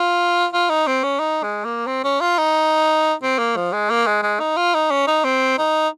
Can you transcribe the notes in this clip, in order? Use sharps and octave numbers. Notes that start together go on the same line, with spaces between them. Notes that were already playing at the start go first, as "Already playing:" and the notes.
Already playing: F4
F4
D#4
C4
C#4
D#4
G#3
A#3
C4
C#4
F4
D#4
C4
A#3
F3
G#3
A#3
G#3
G#3
D#4
F4
D#4
C#4
D#4
C4
D#4